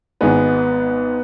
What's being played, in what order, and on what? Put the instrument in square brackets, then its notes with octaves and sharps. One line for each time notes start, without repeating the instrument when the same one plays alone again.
[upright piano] G#1 G#2 G#3 [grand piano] B3